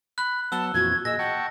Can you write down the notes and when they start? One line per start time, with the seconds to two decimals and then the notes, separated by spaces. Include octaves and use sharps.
0.18 B5 F#6
0.52 F#3 B3 F#5 A5 E6 G7
0.74 F2 A#2 E3 F#4 G#6
1.05 A#2 G#4 D#5 E6 A#6
1.19 F#5 G5 A5 C#6